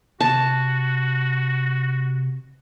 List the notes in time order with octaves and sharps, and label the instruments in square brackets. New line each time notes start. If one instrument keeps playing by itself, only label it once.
[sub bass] C3 [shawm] F#4 [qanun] A5